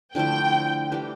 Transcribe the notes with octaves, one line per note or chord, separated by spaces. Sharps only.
D3 F3 A3 E4 G5
E3 G3 D4 G4